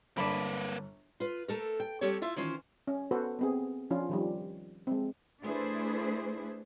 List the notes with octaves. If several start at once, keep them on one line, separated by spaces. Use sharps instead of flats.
G1 A#3 B4 D5 A5 B5
F4 B4
A3 A4 A#4
G5
G3 C4 G4 A4 C#5
E4 F4 E5
D#3 E3 C#4 F4 C5
C#4
B3 F#4 A4 B4 C5
B3 C4 G#4
F3 C#4 D4 F4
D#3 F3 G3
G#3 C4
A3 D4 E4 G#4 B4 C5